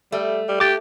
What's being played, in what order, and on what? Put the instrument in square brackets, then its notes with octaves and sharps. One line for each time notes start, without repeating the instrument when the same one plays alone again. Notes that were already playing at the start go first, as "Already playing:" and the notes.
[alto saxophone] G3 [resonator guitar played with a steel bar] A3
[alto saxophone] G3
[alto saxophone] G4 [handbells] D6 A6